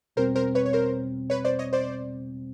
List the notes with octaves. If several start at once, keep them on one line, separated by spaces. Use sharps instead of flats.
E2 B2 G3 C4 A#4 C5
A#4 C5
B4 C#5
C#5
A#4 C5
B4 C#5
C5 D5
C#5 D#5
C5 D5